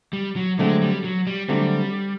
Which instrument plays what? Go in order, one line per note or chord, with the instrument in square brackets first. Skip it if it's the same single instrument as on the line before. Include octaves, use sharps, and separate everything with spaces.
[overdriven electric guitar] G3
F#3
[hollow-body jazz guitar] D3 F#3 A3 C4 [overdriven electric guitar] G#3
[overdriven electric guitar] G3
F#3
G3
[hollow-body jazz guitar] D3 F#3 A3 C4 [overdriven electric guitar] G3